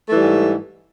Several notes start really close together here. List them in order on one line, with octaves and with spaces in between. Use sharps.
A3 E3 G3 G#2